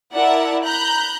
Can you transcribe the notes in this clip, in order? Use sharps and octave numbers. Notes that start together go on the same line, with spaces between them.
E4 A#4 D5 E5 F#5 A5
A#5 B5 F#6 G6